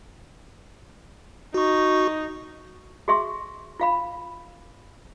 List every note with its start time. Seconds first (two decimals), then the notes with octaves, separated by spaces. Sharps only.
1.54 D#4 F#4 C#6
3.08 F#4 G#4 E5 C6 C#6
3.80 F4 F5 B5